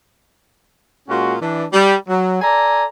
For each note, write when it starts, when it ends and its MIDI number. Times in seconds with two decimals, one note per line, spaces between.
1.09 1.35 46
1.09 1.35 56
1.09 1.35 61
1.09 1.35 65
1.09 1.35 66
1.41 1.64 52
1.41 1.64 62
1.73 1.95 55
2.08 2.42 54
2.42 2.84 69
2.42 2.84 74
2.42 2.84 80
2.42 2.84 82